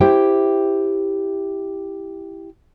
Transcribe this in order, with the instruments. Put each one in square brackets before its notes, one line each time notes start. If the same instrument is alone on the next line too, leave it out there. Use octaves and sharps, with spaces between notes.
[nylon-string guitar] E4 G4 C5 E5 G5